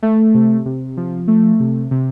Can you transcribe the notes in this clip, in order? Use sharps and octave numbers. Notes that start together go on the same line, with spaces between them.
A3
C3
C3
F3
A3
C3
C3